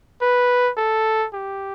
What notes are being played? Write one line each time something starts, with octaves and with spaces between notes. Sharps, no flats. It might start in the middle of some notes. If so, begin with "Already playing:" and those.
B4
A4
G4